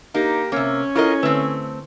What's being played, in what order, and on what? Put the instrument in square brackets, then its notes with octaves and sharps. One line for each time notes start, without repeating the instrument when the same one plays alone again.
[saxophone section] A#3 G4 [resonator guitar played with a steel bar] D#4
[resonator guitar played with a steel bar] C3 A#3 [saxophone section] C#4
[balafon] E4 A4 C#6 [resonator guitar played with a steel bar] F4 A#4 D#5
[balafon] D3 [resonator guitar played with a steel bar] A3 C4